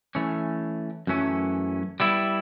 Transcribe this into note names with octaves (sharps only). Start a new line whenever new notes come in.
E3 A3 C#4
F#2 E3 A3 C#4
G3 B3 E4